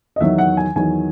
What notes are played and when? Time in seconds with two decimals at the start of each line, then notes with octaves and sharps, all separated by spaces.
0.16 D#5
0.21 E2 D#3 F#3 E5
0.38 F#5
0.57 G#5
0.76 E2 D#3 F#3 G#5